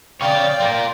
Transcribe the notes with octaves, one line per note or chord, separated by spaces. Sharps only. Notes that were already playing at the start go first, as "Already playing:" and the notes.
C#5 D5 F5 G5
F4 A#4